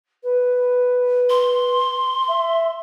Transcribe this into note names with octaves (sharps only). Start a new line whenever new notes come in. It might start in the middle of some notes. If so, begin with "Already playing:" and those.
B4
C6
E5